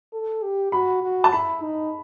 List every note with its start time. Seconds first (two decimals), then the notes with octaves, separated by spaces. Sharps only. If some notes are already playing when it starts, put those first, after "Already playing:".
0.13 A4
0.43 G4
0.72 F#4 B5
1.02 F#4
1.24 A5
1.32 E4 B5
1.62 D#4